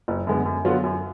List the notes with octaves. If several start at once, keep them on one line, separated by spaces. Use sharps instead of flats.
F#1
F#2 D3 G#3 B3
F#2
D3 F#3 B3 F4
F#2